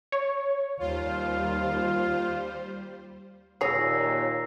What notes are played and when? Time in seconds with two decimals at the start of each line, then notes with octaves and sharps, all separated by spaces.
0.12 C#5
0.80 D#2 G3 F4 C5 F5
3.61 D#2 A#2 G#4 C#5 E6 A#6 C7